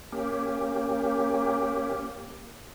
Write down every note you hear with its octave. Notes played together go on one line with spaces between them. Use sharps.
A#3 C#4 G4